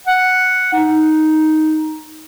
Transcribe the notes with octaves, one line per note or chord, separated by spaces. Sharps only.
F#5
D#4